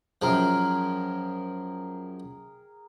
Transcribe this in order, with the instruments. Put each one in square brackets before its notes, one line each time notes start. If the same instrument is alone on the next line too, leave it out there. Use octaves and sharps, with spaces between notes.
[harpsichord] F#2 F3 [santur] G#4 A#4 G5